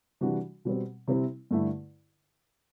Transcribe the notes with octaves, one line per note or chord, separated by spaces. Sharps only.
C3 E3 G3 D4 F#4
B2 G3 C4
C3 G3 C4 E4
G2 D3 A3 E4